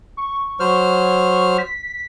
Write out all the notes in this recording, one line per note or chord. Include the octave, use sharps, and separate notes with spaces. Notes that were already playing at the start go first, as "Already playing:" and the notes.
C#6
F#3 C5 F6
B6